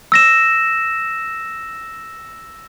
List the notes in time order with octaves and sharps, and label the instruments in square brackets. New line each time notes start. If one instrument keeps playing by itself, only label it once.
[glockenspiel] E6 A#6 E7